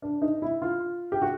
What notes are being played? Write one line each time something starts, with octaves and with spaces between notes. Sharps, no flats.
D4
D#4
E4
F4
G4
F#4